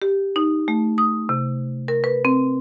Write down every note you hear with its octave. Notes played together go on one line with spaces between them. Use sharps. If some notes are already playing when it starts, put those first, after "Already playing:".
G4
D#4
A3
D#6
C3
A#4
B4
C4